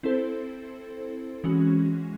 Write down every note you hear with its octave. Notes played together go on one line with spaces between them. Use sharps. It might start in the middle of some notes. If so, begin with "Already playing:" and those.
C4 E4 A4 C5
E3 G#3 C#4 F#4